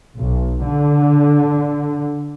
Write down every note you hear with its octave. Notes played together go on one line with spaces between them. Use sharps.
B1
D3